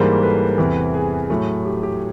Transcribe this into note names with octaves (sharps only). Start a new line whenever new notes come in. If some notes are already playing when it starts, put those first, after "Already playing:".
Already playing: G#2 E3 G3 A#3 A#4 C5
A4 B4
E2 C3 E3
G#4
A2 F#3 A3
G4
G4